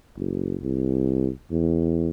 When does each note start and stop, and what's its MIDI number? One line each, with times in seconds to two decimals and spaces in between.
0.17 0.56 30
0.62 1.30 36
1.51 2.09 40